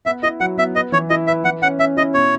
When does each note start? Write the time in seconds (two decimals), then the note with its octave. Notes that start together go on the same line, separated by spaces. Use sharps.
0.06 B3 E5
0.23 E4 D#5
0.40 F#3 F#5
0.58 B3 E5
0.75 B4 D#5
0.92 E3 C#5
1.10 E4 D#5
1.27 B4 E5
1.44 E3 F#5
1.62 C#4 F#5
1.79 C#4 E5
1.97 E4 D#5
2.14 B2 C#5